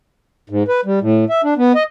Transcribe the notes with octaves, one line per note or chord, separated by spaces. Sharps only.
G#2
B4
G3
A2
E5
D4
B3
D#5